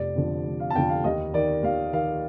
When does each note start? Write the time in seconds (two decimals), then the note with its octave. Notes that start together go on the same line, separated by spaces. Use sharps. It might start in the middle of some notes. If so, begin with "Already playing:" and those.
Already playing: F1 D5
0.16 F2 D3 F3
0.45 F1
0.60 F5
0.70 A5
0.75 F2 D3 F3 G5
0.89 F5
1.04 D#2 D#5
1.34 D#3 D5
1.63 D#2 F5
1.93 D#3 F5